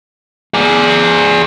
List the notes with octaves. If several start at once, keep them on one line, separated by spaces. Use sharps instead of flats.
G#4 D5